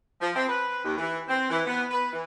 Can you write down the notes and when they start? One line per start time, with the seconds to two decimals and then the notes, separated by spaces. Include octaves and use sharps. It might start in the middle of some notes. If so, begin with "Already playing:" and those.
0.20 F3
0.34 C4
0.48 B4
0.83 D#2
0.97 E3
1.27 C4
1.50 E3
1.66 B3
1.91 B4
2.12 E3